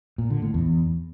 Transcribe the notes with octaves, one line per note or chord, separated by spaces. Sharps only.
A#2
D3
A2
E2